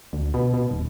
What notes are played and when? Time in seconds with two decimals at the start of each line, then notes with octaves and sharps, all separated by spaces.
0.13 D2
0.34 B2
0.54 B2
0.71 D#1